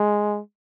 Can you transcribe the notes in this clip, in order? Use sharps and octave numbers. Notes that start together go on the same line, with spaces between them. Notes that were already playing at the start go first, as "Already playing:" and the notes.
Already playing: G#3